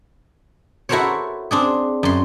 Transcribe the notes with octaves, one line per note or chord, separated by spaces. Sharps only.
E4 F#4 A4 A#4 C5 C#5
C4 D4 G#4
F#2 C6